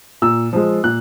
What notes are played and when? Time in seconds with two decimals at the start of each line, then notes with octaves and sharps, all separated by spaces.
0.22 A#2 E6
0.53 F3 G#3
0.84 A#2 F#6